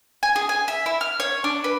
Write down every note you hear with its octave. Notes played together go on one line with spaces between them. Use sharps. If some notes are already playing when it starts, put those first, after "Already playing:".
G#5
G#4
G#5
E5
E4
F6
C#5
D4
B4